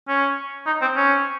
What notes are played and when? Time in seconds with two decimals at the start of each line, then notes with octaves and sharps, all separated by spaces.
0.08 C#4
0.67 D#4
0.82 C4
0.97 C#4